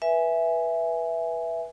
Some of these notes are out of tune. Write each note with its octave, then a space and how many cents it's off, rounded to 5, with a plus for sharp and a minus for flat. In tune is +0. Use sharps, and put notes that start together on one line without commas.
B4 -15 E5 +0 G#5 +0